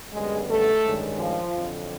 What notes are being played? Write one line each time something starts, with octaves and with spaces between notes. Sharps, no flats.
F#2 D3 G3 G#3 B3 G#4
A3 A4
G2 D#3 G#3 C#4
F3 F4
F2 D3 F#3